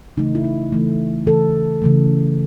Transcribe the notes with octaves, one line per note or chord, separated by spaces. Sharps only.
C#3 E3 A3 D#4
E4
D#4
C#3 E3 A3
C#3 E3 A3 A4
C#3 E3 A3